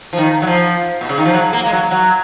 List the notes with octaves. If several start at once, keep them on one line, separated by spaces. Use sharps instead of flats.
F3
D#3
F#3
F3
B2
C#3
D#3
F3
F#3
A#3
G#3
F#3
F#3